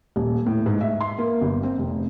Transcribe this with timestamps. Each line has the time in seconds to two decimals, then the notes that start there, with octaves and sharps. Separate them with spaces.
0.16 D#1
0.46 A2
0.66 G#2
0.81 E5
1.01 C6
1.18 A#3
1.41 G1
1.63 C4
1.78 F1